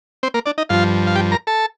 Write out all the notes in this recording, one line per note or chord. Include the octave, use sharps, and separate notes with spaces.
C4 C5
A#3 A#4
D4 D5
D#4 D#5
G2 F3 F4 F5
F5
G4 G5
A#4 A#5
A4 A5